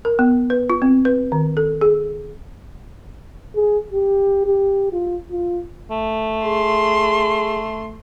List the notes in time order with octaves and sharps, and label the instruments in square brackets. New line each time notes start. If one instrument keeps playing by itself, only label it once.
[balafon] A#4
B3
B4
F4
C4
B4
D#3
A4
G#4
[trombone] G#4
G4
G4
F4
F4
[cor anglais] A3
[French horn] G#4 [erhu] C6